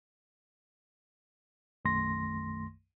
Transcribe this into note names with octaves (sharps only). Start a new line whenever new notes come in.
B1 F#2 D#3 A3 C6 A#6